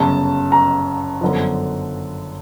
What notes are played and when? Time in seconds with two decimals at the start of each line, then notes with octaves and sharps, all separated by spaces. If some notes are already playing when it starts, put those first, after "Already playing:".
Already playing: G1 F#2 C#3 A5
0.52 A#5
1.21 G1 F#2 D3 F3